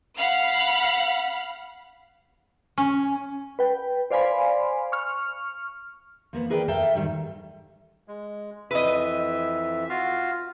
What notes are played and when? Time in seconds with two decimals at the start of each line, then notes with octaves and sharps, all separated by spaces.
0.16 F5 F#5 B5 F6
2.78 C#4
3.59 B4 G5
4.11 C5 D5 F5 G#5 B5 C6
4.92 C#6 F6
6.33 F3 A#3 B3
6.50 G#4 A#4 B4 D5 E5 G5
6.68 A4 E5 F5 G5 A#5
6.95 G#2 D#3 G3
8.08 G#3
8.71 F2 E3 B4 D#5 E5
9.89 F4 F#4 F5